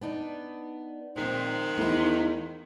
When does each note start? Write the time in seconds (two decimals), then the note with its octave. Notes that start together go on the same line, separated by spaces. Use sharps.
0.01 B3 D4 D#4
1.16 A#2 D#3 F3 G#3 C4
1.78 E2 A3 D#4